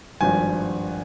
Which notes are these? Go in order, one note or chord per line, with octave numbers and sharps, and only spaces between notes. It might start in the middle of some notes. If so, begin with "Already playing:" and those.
G#1 G2 F3 G#5